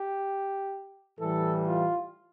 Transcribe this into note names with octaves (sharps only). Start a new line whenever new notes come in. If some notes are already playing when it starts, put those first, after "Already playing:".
Already playing: G4
A2 E3 G3 A4
F4